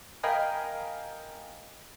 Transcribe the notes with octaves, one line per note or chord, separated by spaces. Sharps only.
A#4 D#5 F5 G5 G#5 B5